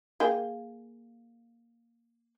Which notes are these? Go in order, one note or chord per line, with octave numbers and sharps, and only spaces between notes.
A#3 G#4 G5